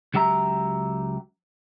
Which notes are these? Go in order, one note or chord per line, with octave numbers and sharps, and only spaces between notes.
C#2 F#3 G4 E5 A#5